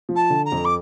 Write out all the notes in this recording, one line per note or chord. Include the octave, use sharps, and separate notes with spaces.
F3
A5
D3
A#5
F2
D6